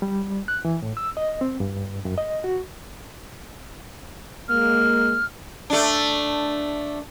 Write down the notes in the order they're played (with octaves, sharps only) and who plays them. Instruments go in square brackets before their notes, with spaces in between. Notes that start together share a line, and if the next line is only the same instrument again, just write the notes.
[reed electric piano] G3
F#6
E3
A2
E6
D#5
C4
G2
F#2
D#5
F#4
[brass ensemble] G#3 A#3 [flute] F6
[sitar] A3 D4